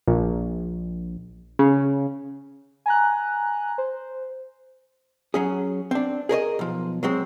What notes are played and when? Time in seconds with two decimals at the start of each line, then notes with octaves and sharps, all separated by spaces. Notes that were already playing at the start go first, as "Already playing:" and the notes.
0.08 A#1
1.59 C#3
2.86 G#5 A#5 F#6
3.78 C5
5.34 F#3 C#4 G#4
5.91 C4 D4
6.29 G#4 A#4 C#5 D#5
6.59 B1 F3
7.03 F#3 G#3 C4